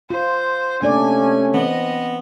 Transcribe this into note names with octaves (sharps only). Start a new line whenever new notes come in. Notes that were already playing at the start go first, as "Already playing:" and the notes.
F4 C5
C3 A3 A#3 C#4 D4 D5 G#5
E3 B3 C4 D#5